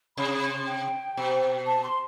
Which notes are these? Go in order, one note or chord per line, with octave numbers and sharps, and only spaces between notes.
C3 B5
B5
C6
G5
B2
A5
C6